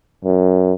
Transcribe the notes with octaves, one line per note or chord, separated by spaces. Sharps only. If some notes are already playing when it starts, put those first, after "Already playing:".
F#2